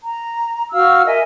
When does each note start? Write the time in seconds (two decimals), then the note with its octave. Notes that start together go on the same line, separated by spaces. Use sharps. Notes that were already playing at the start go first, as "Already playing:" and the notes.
0.03 A#5
0.72 F#4 F5 E6 F6
1.07 A#4 D#5 E5 G#5